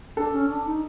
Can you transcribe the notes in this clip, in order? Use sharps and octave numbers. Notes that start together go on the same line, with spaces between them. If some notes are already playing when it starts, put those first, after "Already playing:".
D4 A4
C#4
D4
D#4